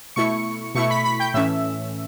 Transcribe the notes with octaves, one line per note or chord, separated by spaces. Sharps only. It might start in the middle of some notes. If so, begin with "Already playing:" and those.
B2 A3 E4 C#6 C#7
B2 A3 E4 C#6 C#7
B5 B6
B5 B6
G5 G6
A2 E3 A3 C#4 E5 E6